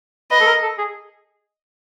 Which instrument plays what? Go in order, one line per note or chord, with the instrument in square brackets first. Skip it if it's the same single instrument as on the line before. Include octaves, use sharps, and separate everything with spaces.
[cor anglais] B4 [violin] D#5
[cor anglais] A4
A#4
A4
G#4